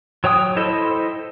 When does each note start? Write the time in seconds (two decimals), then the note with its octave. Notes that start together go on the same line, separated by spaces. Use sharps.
0.24 F#3 C#5 G5 D#6
0.56 E4 A4 C5 D#5